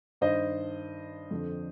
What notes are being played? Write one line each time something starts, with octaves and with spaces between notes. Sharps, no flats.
G2 D#3 C5 D#5
F2 D3